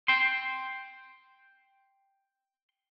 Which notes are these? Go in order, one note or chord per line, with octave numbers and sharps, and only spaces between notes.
G5 C6